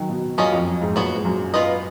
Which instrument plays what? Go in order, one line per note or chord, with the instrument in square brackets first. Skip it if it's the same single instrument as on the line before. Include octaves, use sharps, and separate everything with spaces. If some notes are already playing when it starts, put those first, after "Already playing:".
Already playing: [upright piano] D#3 F#3
B2
[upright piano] F#2 [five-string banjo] A#3 C#4 F4 G#4 D#5
[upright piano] F2
F#2
G#2
[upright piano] A#2 [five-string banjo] F#3 B3 F#4 B4
[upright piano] G#2
F#2
[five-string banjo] B3 F4 B4 D#5